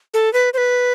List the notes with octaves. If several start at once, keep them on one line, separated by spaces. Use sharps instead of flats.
A4
B4
C5
B4